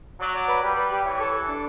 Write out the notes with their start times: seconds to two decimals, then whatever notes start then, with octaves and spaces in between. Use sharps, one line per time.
0.20 F#3 D5
0.34 D5
0.48 B4
0.63 G3 B4
0.77 B4
0.91 G4
1.05 E3 C#5
1.20 A4
1.35 A4
1.48 D4